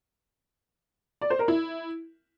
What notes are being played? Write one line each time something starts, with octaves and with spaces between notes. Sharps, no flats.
D5
C5
A#4
E4